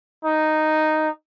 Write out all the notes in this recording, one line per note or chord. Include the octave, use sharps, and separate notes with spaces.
D#4